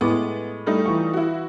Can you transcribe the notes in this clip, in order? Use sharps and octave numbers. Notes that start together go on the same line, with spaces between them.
A2 G#3 B3 D6
G3 A3 D#4
E3 F4 C#6
E4 F#4